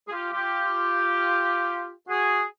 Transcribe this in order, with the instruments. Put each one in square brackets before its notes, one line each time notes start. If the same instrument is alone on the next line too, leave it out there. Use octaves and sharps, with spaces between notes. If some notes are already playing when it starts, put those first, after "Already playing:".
[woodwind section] G#4
F4 G4
F4 G4
F#4 G#4